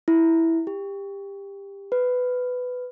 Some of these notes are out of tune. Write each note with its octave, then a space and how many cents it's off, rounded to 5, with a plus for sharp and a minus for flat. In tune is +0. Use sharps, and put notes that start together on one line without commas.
E4 -5
G4 +20
B4 +15